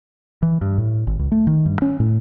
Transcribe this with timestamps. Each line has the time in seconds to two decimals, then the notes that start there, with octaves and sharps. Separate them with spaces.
0.42 E3
0.61 G2
0.78 A2
1.07 G#1
1.19 C#2
1.32 A3
1.47 D#3
1.66 G2
1.82 C#4
2.00 A2